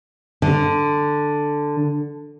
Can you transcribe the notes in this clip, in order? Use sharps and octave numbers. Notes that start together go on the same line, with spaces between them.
D3